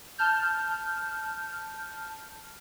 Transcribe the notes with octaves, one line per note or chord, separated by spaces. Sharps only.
A5 F6 G6